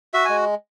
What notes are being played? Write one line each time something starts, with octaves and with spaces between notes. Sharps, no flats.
F#4 E5
G#3 G#5